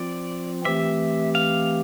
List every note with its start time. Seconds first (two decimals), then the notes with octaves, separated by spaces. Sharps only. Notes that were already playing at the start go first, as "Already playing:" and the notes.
Already playing: F3 C4 F4 D5
0.65 E3 A3 C4 G4 E5
1.35 F5